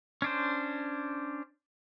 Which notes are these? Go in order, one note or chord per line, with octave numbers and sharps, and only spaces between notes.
C#4 D4 C5